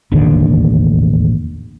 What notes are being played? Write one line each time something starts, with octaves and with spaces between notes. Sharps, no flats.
E1 A1 D#2 D3